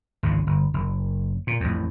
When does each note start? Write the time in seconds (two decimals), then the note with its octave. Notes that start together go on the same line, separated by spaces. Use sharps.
0.23 G#1 C#2 C#3
0.47 G1
0.74 F#1
1.47 A#2
1.60 A1 F2